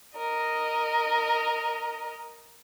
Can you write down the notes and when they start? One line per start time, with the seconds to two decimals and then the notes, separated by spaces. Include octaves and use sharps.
0.17 A#4 D#5